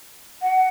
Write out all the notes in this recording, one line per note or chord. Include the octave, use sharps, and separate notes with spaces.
F#5